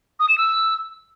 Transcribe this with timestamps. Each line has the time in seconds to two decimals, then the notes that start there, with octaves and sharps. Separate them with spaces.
0.20 D#6
0.29 E7
0.38 E6